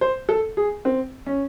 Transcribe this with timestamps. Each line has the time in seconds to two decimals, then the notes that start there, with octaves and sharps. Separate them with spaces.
0.01 C5
0.29 A4
0.57 G#4
0.85 C4
1.26 C#4